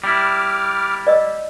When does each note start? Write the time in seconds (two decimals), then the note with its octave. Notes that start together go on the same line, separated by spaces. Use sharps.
0.04 G3 E4 D6 F6
1.07 D5 D#5 E6